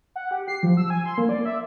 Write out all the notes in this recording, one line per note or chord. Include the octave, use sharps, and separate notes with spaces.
F#5
G4
C7
F3
E6
G#5
C6
A#3
D5
E5